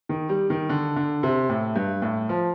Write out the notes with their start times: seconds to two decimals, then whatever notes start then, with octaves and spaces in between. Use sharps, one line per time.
0.09 D#3
0.29 G3
0.50 D#3
0.69 D3
0.96 D3
1.23 C3
1.49 A2
1.76 G2
2.02 A2
2.29 F3